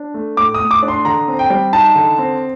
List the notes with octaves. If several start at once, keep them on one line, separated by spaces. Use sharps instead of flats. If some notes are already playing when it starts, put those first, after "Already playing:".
Already playing: D4
A3
A2 D6
D#6
A2
D6
D4
C6
D3 A#5
C4
G5
G3
D#4 A5
D3
C4